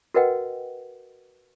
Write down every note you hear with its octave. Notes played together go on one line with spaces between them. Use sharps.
F#4 A#4 B4 D#5 F#5 G5